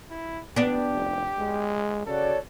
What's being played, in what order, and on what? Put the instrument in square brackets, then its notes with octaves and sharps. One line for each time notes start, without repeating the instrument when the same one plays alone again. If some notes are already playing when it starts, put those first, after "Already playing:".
[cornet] E4
[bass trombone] A1 [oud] B3 D4 [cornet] G4
[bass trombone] F1
G#3
[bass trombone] C#3 [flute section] F#4 C#5 D5 [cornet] A4